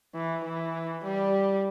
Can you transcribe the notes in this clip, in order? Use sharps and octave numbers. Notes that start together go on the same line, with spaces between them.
E3
E3
G3